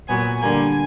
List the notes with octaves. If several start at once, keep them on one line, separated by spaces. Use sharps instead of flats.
A#2 F#3 B3 G#5
D3 G3 A#3 G#5